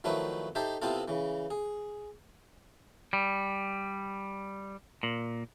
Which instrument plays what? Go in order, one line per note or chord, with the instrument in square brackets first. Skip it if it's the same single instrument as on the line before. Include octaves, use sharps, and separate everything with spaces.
[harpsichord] D#3 F3 F#3 A3 E4 B4
D#4 G4 A4 C5 E5
C3 B3 C4 E4 F4 A4
C#3 E3
G#4
[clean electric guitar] G3
A#2